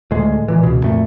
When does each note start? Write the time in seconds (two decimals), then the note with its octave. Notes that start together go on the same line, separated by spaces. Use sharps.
0.11 D2 A2 G#3
0.48 A#2 E3
0.63 C#2 B2
0.84 F2 A#2 A3